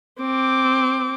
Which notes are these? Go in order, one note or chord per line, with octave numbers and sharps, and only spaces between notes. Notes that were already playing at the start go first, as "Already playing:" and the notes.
C4 D6